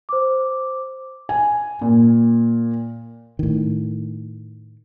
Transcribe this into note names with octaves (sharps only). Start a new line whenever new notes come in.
C5 D6
G#5
A#2
A2 D#3